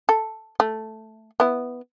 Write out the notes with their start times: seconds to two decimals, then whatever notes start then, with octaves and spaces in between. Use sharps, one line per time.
0.09 A4
0.60 A3
1.40 B3 E4